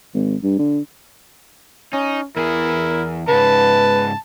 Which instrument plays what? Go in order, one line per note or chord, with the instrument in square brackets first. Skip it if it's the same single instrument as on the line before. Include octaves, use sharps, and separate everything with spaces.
[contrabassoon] G#1
G2
D3
[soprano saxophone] C#4 [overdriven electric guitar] D#4
[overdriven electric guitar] E2 G#4 [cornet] E4 [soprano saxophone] A#4
[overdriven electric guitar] G#2 C#3 [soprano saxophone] B4 [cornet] A5